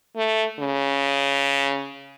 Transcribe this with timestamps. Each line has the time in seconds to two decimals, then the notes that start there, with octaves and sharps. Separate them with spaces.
0.16 A3
0.59 C#3